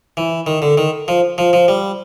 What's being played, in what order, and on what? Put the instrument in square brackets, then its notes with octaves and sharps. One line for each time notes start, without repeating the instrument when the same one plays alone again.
[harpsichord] E3
D#3
D3
D#3
F3
F3
F3
G3